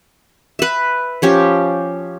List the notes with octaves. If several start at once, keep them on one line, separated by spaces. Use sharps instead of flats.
B4 E5
F3 C#4 G4